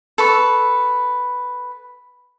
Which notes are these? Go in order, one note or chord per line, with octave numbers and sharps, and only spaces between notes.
A4 B4 C#6